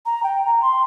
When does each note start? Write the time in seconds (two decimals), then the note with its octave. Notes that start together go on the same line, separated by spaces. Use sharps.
0.06 A#5
0.23 G5
0.43 A#5
0.62 C6